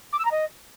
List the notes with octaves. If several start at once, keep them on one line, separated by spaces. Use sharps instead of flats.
D6
E6
A#5
D#5